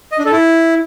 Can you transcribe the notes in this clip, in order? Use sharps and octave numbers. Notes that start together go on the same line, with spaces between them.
D#5
D4
A4
E4